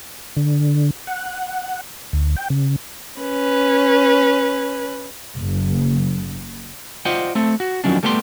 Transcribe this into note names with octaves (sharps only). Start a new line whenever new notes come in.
D3
F#5
D2
G5
C#3
C#4 B4
F#1
F4 C5 D5 D#5 F#5 G5
A3 C4 A4
F#4
F2 D#3 F#3 C#4 D4
G3 A3 B3 G4 E5 C6